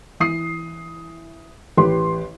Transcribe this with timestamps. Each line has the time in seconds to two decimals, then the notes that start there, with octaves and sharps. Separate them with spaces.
0.20 E3 D#6 C7
1.77 A1 G4 B4 C6